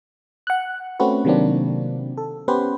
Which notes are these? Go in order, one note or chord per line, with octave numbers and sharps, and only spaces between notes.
F#5 F#6
A3 C4 C#4 F#4 B4
C3 D#3 F#3 A#3 C4 D4
A4
B3 C#4 G4 B4 C5